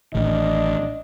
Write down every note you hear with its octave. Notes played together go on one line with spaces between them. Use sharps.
A1 A2 D#3 D4 D#5